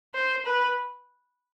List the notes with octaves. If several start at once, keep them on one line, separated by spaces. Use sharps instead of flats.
C5
B4